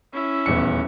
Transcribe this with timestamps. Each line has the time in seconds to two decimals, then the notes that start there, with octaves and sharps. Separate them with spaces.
0.13 C#4 E4
0.46 D#1 E2 C#7